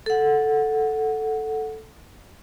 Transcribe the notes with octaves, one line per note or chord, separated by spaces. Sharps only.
A4 F#5